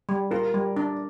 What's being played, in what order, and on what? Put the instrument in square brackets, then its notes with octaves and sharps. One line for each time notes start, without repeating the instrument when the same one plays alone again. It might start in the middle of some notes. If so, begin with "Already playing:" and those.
[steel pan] G3
[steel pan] F4 [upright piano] A#4
[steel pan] G3
D4